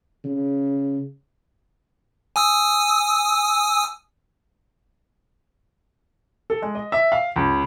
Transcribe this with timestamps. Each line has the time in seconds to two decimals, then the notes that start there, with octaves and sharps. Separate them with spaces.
0.24 C#3
2.36 G#5 D#6 E6
6.50 A4
6.62 G#3
6.75 D#5
6.92 E5
7.12 F5
7.36 C#2